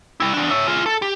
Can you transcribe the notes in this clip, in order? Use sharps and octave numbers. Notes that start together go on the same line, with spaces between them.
G3 E4
E2 D4
C#5 E5
F4 G#4
A4
G4